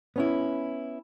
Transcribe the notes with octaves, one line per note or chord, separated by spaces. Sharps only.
B3 C#4 E4